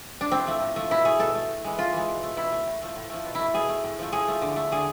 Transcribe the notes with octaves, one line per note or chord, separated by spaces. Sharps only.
D4
A2 C4
F3 A3
A2
F3 A3
B2 E4
A3 G#4
B2 A4
A3
A2
E3 G#3
A2 F4
E3 G#3
B2
A3
B2 E4
A3
A2
F3 A3
A2
F3 A3
B2
A3 E4
B2 G#4
A3
A2
F3 A3
A2 G#4
F3 A3
D3
A3
D3 G#4